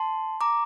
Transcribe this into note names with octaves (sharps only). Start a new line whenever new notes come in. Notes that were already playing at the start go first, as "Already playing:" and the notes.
Already playing: A5 C6
A#5 D6